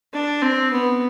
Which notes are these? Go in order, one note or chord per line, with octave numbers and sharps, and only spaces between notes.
D4
C4
B3